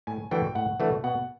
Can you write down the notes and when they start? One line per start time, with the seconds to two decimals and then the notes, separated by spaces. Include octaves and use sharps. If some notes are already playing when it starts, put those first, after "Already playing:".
0.07 A2 G#5
0.31 E3 A3 D4 F#4 G5
0.55 A2 F#5
0.80 E3 A3 D4 F#4
1.04 B2 F#5